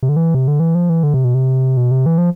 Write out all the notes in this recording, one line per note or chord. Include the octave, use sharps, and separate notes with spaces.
C3
D3
E3
C3
D3
E3
F3
E3
D3
C3
B2
C3
B2
C3
E3
F3